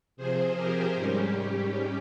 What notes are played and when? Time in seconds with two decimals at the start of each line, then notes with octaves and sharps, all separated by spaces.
0.17 C3 F3 C4 G#4 C5
0.55 G4 A#4
0.94 G#2 G3 C#4 G4